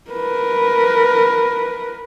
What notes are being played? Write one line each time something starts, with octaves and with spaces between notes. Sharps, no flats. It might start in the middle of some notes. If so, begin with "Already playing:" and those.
A#4 B4